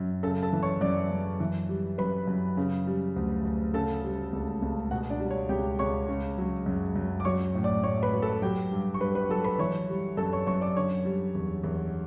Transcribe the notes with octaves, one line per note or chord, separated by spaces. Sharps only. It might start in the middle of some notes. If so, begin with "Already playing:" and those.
Already playing: F#2
C#3 A4 A5
A4 A5
E3
C#5 C#6
F#2 D5 D6
F#2
E3
G3
F#2 B4 B5
F#2
C#3
G3
D2
D2
C#3 A4 A5
G3
C#2
C#2
B2 F#4 F#5
D4 D5
G3
C#5
C#2 G4 G5
C#2 C#5 C#6
C#3
F#3
F#2
F#2
D6
F#3 C#5 C#6
A2
D5 D6
A2 C#5 C#6
B4 B5
F#3
A4 A5
F#3 G4 G5
G2
C#6
G2 B4 B5
B4 B5
F#3 A4 A5
B4 B5
E3 C#5 C#6
G3
F#2 A4 A5
C#5 C#6
F#2 C#5 C#6
D5 D6
D3 C#5 C#6
G3
E2
E2